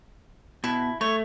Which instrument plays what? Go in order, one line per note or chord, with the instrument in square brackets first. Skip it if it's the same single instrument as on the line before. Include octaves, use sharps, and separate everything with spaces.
[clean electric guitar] B2 [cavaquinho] E4
[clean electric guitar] A3 [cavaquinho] C#5